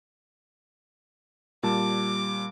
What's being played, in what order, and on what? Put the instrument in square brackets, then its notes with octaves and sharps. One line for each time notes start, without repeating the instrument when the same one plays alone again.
[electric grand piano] A#2 G3 A5 [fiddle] D6